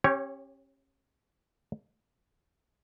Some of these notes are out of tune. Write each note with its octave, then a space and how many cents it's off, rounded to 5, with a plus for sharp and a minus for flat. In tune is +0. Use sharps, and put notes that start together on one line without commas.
C#4 -35 G4 +0 C#5 +0